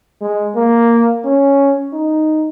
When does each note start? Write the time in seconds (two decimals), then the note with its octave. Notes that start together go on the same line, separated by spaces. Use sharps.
0.22 G#3
0.56 A#3
1.25 C#4
1.93 D#4